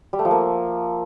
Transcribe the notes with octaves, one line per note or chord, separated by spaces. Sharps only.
G3
A3
F3
A#3